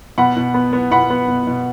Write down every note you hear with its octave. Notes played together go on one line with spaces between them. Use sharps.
B2 F#5 B5
B2
B3
B3
B2 F#5 B5
B3
B2
B2